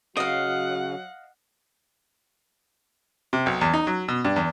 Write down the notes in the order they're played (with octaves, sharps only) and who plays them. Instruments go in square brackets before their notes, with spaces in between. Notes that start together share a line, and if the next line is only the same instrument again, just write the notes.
[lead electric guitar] C#3 [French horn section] F#3 F#4 [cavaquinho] D#5 F5 [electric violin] F#5
[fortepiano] C3
B1
E2
D#4
F#3
B2
G2
E2